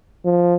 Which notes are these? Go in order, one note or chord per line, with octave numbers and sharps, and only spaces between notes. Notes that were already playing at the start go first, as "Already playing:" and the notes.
F3